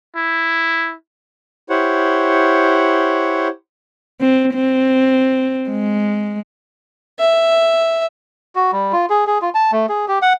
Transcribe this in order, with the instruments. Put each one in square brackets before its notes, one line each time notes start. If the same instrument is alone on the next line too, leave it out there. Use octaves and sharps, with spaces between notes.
[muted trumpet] E4
[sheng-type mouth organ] E4 G4 C5 C#5 F#5
[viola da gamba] C4
C4
G#3
[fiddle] E5
[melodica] F#4
G3
F4
G#4
G#4
F4
A5
A3
G#4
G4
F#5